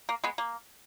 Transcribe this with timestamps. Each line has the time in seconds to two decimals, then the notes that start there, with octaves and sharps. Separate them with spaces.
0.09 A#3
0.24 G#3 B3
0.38 A#3